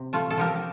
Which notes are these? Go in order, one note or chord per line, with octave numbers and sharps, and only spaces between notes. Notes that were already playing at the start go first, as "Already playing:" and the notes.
Already playing: C3
A3 F4 A4
A4
F3 G4 A#4